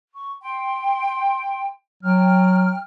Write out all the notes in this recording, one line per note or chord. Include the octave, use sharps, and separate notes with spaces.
C#6
G5 C6
F#3 G5 F6